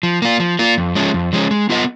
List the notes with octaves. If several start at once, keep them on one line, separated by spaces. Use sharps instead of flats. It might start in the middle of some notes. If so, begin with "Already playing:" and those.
F3
A#3 F4
F3
A#3 F4
F2
F3 G#3 C#4
F2
F3 G#3 C#4
G#3
B3 F4 A#4 D#5